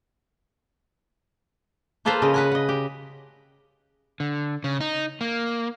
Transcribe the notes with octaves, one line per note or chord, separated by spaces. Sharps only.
F3 A#3 F4 A4 B4 C5
C#3 D#5
B4 F#5 G#5
D#5 F#5
G4
D3
C#3
D#4
A#3